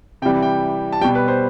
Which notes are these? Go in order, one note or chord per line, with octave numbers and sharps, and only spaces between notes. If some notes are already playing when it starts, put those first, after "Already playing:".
C3 E3 G3 G5
G5
A5
B2 G3 G5
B4
C5